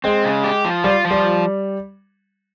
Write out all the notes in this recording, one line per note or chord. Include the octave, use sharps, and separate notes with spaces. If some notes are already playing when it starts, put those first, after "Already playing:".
G#3 C4
C#3
G4
F3
G3 F4
F3
G3